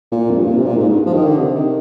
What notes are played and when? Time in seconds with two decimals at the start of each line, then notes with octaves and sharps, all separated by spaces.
0.12 A#2
0.30 F2
0.38 G2
0.47 A#2
0.56 C3
0.65 A#2
0.77 G#2
0.89 G2
1.06 F3
1.13 D#3
1.26 D3
1.38 C3
1.55 D#3